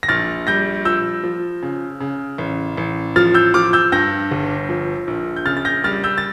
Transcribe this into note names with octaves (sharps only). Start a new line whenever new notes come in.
A#6
A#1 F6 A6
G3 G6 A#6
F3 E6 G6
F3
C#3
C#3
A1
A1
F3 F6 A6
E6 G6
F3 D6 F6
E6 G6
G2 G6 A#6
G1
F3
A#1
G6
C#3 F6 A6
A6
G6 A#6
G3 F6 A6
E6 G6
A6